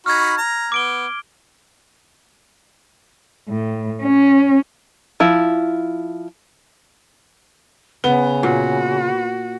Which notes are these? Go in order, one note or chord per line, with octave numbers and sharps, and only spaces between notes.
D#4 F#4 B5 F6 G#6
A#5
B3 D6 D7 G7
A2
C#4
F3 E4
C#3 B3 G7
A#2 F#4